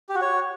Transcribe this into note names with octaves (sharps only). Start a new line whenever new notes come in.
G4
F#4
C#5